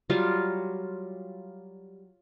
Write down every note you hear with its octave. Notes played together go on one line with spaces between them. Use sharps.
F#3 G3 F4